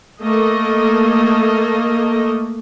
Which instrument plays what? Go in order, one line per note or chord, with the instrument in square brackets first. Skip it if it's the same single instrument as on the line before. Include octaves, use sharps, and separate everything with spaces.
[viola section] A3 A#3 D#5